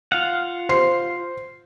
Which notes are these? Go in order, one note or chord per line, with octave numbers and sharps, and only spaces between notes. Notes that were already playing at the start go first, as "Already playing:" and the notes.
F4 F5 F#5
C5 C6 C7